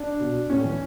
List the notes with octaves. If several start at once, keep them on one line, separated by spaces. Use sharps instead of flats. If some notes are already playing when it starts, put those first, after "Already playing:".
Already playing: D4
B2
A2 C#4
E3